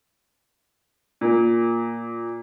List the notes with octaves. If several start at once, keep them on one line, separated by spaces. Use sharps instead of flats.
A#2